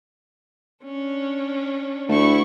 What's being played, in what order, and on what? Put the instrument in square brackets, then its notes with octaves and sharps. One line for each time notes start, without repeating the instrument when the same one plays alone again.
[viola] C#4 D4
[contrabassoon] D2 [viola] E4 C#6